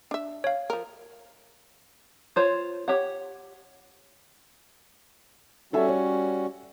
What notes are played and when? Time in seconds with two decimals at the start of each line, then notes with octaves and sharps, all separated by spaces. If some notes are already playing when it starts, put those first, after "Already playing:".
0.11 D4 E5
0.44 C#5 F5
0.70 F3 A#4
2.36 F4 C5 C#5
2.88 G4 C#5 F#5
5.73 G3 C#4 F#4 A4 E5 G#5
5.88 C#5